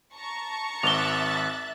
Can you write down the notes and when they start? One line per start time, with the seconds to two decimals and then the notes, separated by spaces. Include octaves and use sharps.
0.15 A5 A#5 C#6
0.83 G#1 E5 D6 F#6 A6 F7 G7